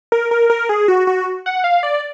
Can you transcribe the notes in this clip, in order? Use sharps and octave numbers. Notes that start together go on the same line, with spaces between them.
A#4
A#4
A#4
G#4
F#4
F#4
F#5
F5
D5